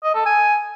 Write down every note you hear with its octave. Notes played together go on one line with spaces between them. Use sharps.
D#5
A4
G#5